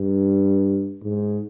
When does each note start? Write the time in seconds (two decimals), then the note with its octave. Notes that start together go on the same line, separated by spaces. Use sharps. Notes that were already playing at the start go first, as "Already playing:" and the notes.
Already playing: G2
1.03 G#2